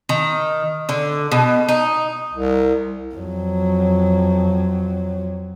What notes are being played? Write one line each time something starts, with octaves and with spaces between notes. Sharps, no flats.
D#3
D3
B2
D#4
C2
F2 F#3